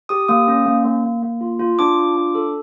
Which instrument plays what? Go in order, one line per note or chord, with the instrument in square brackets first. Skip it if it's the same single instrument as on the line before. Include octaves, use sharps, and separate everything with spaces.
[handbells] G4 D#6
A#3 D#6
C#4
A#3
A#3
A#3
A#3
F4
F4
D4 D6
F4
D4
A4